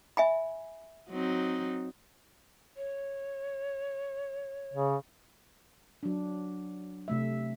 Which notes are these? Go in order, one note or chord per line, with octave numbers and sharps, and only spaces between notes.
E5 G#5 B5
F#3 C4 D#4
C#5
C#3
F#3 D4
C3 A3 E5